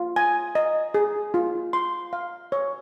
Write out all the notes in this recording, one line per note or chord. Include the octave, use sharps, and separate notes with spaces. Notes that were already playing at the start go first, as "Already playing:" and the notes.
Already playing: F4
G#5
D#5
G#4
F4
C6
F5
C#5